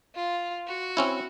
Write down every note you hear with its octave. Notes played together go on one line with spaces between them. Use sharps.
F4
F#4
C4 C#4 E4